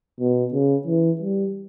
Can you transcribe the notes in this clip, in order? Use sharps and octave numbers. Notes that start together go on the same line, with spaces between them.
B2
C#3
E3
G3